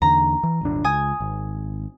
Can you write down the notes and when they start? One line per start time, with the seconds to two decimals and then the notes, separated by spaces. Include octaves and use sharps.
0.02 E2 D3 A#5
0.43 E3
0.61 D#1 G#1 D4
0.84 C#2 G#5 D#6
1.20 G#1